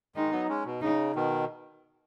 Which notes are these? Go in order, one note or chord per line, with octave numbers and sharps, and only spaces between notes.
D#3 G#3 D#4
F#3 B3
G#3 C#4
B2
C#3 D#4
B2 D#3